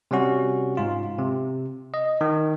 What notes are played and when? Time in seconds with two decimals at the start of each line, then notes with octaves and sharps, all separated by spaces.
0.11 C3 G3 C#4 F#4
0.77 G#2 F4
1.18 C3
1.94 D#5
2.21 D#3